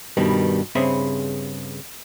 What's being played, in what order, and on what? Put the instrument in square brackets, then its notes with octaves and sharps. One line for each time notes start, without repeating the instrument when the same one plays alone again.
[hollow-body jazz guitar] G2 B2 D#3 G3
G2 C#3 C4 G#4 E5 B5